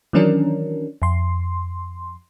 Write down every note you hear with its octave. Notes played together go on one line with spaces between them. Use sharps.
D#3 E3 F#3 C#4 D4 A#4
F2 C6